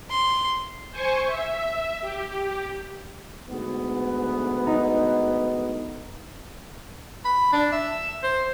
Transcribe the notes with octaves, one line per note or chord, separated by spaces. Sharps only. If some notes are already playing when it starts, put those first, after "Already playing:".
C6
C5 G#5 C#6
E5
G4
D2 G#2 B3
D#4
B5
D4
E5
C5